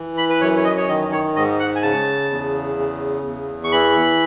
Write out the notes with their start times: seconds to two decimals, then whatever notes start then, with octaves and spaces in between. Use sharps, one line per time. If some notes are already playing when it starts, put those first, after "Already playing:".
Already playing: E3
0.17 B5
0.30 B4
0.41 F#2 C#5
0.57 C#5
0.65 D#5
0.77 C#5
0.88 D#3 D#5
1.12 C#5
1.36 G#2 D#5
1.60 F#5
1.76 G#5
1.82 C#3 A5
2.31 E2
2.78 C#3
3.26 E2
3.64 C#6
3.72 E3 B5